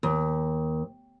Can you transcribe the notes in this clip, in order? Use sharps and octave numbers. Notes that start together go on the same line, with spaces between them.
D#2